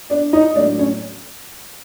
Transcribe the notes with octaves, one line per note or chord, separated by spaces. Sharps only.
D4 D5
D#4 D#5
A2 F#3 A3 D4 D5
C#4 C#5